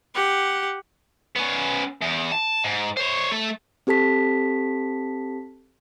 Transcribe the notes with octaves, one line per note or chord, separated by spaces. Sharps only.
G4 F#5
B3 C#4
E2
A5
G#2
C5 C#5
A3 A4
C4 G4 A4 A5 B6